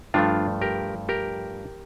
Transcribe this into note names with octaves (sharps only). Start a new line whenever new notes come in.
G2 F3 A3 D4 F4
G4 A#4
G4 A#4